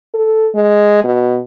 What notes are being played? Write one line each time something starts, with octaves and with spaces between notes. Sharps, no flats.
A4
G#3
B2